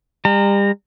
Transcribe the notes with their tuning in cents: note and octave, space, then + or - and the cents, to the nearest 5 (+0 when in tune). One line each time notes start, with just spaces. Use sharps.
G3 +35 A#5 -25